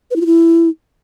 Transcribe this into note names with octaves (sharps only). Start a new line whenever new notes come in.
B4
E4
F4
E4